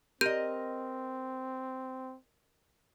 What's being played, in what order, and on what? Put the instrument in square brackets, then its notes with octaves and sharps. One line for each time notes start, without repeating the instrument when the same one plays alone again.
[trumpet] C4 [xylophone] G4 G6 D#7 [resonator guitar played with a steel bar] A#4 D#5